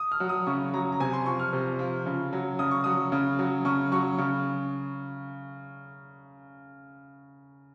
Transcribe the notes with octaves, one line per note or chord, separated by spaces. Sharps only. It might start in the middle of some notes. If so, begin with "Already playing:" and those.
Already playing: D#6
F6
F#3
D#6
C#3 C#6
F#3 A#5
A#5
C3 G#5
C6
F3 C#6
F6
C3
F3
C#3
F#3
C#3 D#6
C#6
F#3 D#6
C#3
F#3
C#3 C#6
F#3 C#6
C#3